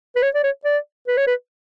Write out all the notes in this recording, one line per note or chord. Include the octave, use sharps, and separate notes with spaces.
B4
C#5
D5
C#5
D5
B4
C#5
B4